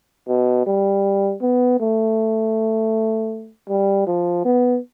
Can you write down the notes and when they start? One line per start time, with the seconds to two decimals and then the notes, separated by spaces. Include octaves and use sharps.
0.28 B2
0.66 G3
1.41 B3
1.80 A3
3.69 G3
4.07 F3
4.45 B3